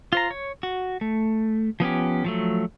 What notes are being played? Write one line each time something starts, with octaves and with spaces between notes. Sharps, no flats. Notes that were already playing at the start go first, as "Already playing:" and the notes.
F4 C5 A#5
C#5
F#4
A3
F3 B3 C#4 G4
F3 F#3 A3